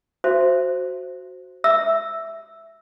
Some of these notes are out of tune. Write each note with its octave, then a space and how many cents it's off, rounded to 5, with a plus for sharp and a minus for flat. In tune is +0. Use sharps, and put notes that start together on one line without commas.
F#4 +0 C5 +0 E5 +35
E5 +0 E6 +0